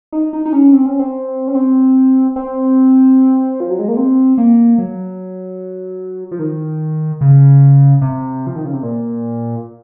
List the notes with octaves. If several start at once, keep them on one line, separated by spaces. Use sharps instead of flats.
D#4
D#4
D#4
C#4
C4
C#4
C4
C#4
C4
C4
F3
F#3
G#3
A#3
C4
A#3
F#3
F3
D#3
C#3
C3
F3
D#3
C#3
C3
A#2